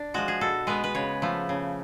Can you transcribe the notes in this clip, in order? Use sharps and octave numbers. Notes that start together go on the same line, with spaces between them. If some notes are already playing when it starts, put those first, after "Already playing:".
Already playing: D4
F3 G#3 F#4
G#4
B2 A4
G#3 B3 B4
B4
C#3 C#5
F3 A3
C#3